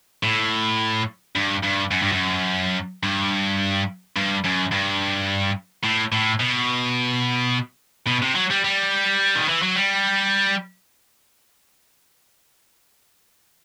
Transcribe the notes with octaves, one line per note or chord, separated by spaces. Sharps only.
A2
G2
G2
F#2
G2
F#2
G2
G2
F#2
G2
A2
A2
B2
B2
C3
F#3
G3
G3
D#3
E3
F#3
G3